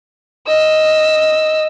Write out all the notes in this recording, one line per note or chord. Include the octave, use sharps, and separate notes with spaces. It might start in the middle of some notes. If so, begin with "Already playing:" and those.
D#5 E6